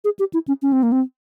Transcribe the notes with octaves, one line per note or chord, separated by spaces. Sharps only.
G#4
G4
E4
C#4
C#4
C4
A#3
C4